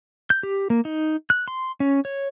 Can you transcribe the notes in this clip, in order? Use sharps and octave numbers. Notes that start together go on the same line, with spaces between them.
G6
G4
A#3
D#4
F#6
C6
C#4
C#5